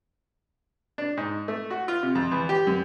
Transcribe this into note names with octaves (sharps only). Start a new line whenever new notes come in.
D4
G#2
A3
F#4
F4
C3
F2
E2
G4
F#2